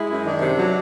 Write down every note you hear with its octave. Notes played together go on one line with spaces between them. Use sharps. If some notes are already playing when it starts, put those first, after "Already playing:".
Already playing: G#3 E4
F#2
D#3 D4
C3
F#3